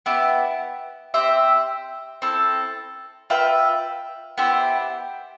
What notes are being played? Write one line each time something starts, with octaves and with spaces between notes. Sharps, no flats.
B3 E4 G4
C4 G4 C5 E5
C4 E4 A4
F4 B4 E5 G5
B3 E4 G4 C5